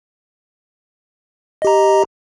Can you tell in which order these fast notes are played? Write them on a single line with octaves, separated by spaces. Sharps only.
D#5 G4 A#5